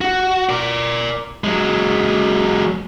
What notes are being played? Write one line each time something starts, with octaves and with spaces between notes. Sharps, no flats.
F#4
A#4 D5
F#3 G#3